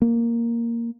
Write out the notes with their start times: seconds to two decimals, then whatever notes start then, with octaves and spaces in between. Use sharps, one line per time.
0.02 A#3